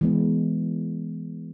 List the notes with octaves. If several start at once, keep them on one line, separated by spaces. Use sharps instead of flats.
E3 G#3 B3